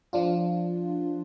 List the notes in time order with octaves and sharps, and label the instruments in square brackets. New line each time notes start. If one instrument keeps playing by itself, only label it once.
[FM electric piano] F3 D4 F4